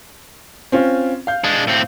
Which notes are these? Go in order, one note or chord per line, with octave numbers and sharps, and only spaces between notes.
C4 C#4 F4
F5 G6
G#3 D4
A2 C4